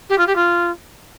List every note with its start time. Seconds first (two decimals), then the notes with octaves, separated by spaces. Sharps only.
0.09 G4
0.18 F4
0.26 G4
0.35 F4